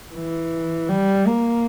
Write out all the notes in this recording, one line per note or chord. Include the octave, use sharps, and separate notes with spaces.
E3
G3
A#3